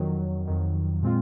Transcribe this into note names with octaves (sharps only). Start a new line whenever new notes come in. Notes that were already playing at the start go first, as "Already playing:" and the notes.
Already playing: F2 D#3 F#3
F2 D#3 F#3
A#2 G#3 C4 F4